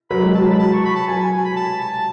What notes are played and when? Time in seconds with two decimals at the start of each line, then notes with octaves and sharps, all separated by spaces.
0.10 F#3 B5
0.23 G#3
0.35 F#3 A5
0.52 B5
0.59 A5
0.73 C#6
0.85 B5
0.95 A5
1.07 F#3 G#5
1.20 G#5
1.32 G#5
1.44 B5
1.56 A5
1.80 A5